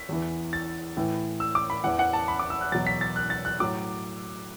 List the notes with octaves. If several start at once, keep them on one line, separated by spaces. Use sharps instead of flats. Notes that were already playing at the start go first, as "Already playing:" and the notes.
Already playing: B6
E2 E3
A6
A2 E3
E6
D6
B5
E2 E3 F#5
F#5
A5
B5
D6
E6
F#6
E2 B2 F#3 A6
B6
A6
F#6
A6
F#6
A2 F#3 D6